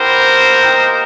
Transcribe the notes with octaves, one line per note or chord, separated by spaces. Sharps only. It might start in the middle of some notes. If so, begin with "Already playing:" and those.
Already playing: B3 E4 G4 A#4 C5
A#3 D#4 G4